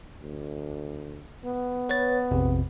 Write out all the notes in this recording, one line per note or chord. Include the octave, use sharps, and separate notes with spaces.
D2
B3
B4 C#5 A6
A#1 F2 C3